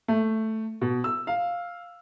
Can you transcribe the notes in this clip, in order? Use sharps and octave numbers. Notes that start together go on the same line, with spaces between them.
A3
B2
E6
F5